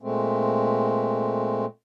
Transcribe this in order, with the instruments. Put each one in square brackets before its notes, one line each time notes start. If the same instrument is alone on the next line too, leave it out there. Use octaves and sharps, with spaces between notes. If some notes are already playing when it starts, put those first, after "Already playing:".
[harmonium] A#2 G#3 A3 C4